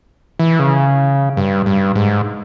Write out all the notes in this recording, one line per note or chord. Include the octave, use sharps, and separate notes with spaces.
E3
C#3
G2
G2
G#2